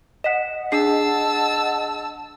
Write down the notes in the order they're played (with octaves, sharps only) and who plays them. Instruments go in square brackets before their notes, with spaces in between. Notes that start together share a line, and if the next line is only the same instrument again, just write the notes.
[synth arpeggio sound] D#5 F#5 [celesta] B6 E7
[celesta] D4 G#4 C7 [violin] A5 E6